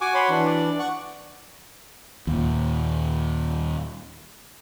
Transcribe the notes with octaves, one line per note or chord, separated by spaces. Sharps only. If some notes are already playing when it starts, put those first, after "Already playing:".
F#4 G#5 D6
C#5 B5 C6
E3 D4
D5
F#5 C#6 F#6
D#2 A#2